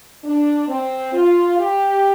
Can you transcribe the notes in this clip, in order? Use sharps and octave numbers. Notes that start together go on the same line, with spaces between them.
D4
C4
F4
G4